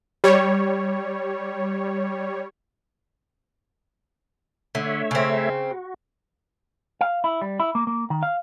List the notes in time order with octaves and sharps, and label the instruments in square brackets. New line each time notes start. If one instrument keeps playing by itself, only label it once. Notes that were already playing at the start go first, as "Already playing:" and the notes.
[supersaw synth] G3 C#5
[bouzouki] D3 [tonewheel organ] A3 C#5 E5
[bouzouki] C#3 C4
[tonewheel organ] F#4
[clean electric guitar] F5
E4
G3
E4
A#3
A#3
D#3
F5